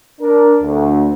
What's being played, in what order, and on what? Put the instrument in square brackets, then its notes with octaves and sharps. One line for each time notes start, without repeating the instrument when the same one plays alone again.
[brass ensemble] D4 A#4
D2